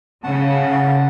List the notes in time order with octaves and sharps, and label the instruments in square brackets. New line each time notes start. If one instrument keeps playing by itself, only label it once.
[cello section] C#3 [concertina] F#5 A5